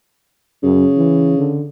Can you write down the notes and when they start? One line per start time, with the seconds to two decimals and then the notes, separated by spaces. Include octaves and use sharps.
0.63 F#2 C#3
0.97 E3
1.38 D3